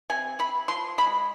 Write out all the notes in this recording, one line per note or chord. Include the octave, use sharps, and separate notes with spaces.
C3 G#5
C3 B5
F3 C6
G#3 B5